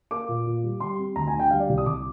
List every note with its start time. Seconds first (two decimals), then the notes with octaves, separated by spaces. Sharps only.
0.11 A#3 D6
0.28 A#2
0.46 A#2
0.63 G3
0.80 G3 C6
0.99 C4
1.16 D2 A#5
1.28 G#5
1.33 D3
1.39 G5
1.51 G3 F5
1.60 D5
1.69 C2
1.78 D#6
1.86 C2 D6